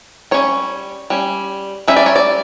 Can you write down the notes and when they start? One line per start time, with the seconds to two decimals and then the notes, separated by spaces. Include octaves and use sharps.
0.31 G3 C#4 C#5
1.10 G3 C#4
1.88 G3 C#4 E5
1.97 D5
2.06 C#5
2.16 D5